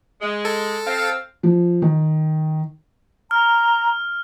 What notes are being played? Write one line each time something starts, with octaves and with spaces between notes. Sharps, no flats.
G#3
A4
C4 F5
F3
D#3
A#5 F6